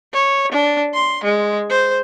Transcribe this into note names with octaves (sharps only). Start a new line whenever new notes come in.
C#5
D4
C6
G#3
C5